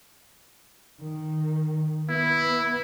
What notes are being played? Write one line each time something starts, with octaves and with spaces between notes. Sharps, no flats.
D#3
B3 E4